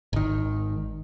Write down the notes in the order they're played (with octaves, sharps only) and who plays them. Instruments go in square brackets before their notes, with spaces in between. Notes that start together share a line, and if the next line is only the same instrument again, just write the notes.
[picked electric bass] G#1 D#3